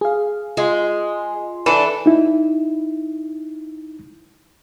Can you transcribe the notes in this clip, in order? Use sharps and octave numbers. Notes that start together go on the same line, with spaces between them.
G#4 F5
G#3 F4 G#5 C6
E3 D4 A4
D#4 E4